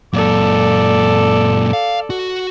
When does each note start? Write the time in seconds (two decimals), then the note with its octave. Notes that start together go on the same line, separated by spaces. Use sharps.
0.13 F#2 A#2 A4 D5
1.73 F5
2.10 F#4